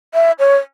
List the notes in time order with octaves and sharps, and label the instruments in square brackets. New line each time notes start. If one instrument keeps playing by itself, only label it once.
[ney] E5
C#5